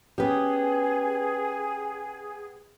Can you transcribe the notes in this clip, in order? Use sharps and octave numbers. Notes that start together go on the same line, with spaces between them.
B3 C#4 G4 G#4 B4